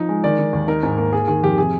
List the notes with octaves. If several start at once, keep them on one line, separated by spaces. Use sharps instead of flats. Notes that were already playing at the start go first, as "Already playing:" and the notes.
Already playing: F3 D#4
G#3
D#3 D5
D#3
D#2
D#4 A#4
G#2
A#3
A#3 G#4
D#3 G#4
F2 G4
C3 G#4